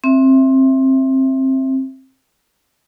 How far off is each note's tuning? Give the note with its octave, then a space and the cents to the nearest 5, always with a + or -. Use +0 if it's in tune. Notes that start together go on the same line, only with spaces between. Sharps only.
C4 +20 E5 +0